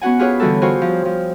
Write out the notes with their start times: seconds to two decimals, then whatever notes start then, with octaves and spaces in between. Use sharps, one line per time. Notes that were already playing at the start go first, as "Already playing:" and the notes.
0.01 B3 C#4 F#4 F#5 G#5
0.19 F4 G4 G#4 B4 C#5
0.40 D3 E3 G3 F#4 A4
0.62 F4 F#4 G#4 C5 C#5 G5
0.82 F3
1.05 F3